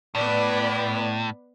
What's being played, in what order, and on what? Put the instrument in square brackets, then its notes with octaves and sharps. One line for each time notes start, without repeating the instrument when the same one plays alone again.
[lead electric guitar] A2 [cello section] B3 B4 D5